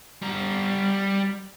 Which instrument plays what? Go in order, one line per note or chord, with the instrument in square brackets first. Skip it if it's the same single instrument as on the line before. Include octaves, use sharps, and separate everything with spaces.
[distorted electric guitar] G3 A#5